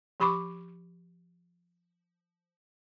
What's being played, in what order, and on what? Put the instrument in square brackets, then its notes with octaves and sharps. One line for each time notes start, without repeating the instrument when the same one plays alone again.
[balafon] F3 G4 B5 C#6 D6